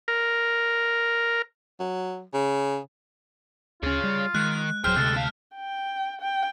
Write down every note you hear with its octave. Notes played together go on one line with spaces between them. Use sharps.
A#4
F#3
C#3
D2 C#4 F4 G#4 C#5
G3
D#3 G#3 F#6
D1 F#3 G#4 C5 G5 F6
D2 C3 G3 G#3 A4
G#3 F5 A5
G5
G5